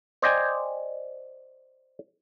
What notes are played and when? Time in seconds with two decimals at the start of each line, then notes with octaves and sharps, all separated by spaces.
0.22 C5 D5 D#5 G5 G#5